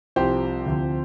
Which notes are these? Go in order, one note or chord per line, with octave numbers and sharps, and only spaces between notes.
C2 C3 F3 G4 C5
D2 C3 F3